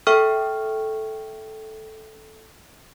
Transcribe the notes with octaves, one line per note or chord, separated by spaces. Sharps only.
A4 E5 G5 C#6 F6